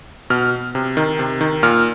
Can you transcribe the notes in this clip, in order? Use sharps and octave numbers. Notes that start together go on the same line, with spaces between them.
B2 F6
C3
D#3
C3
D#3
A#2 F6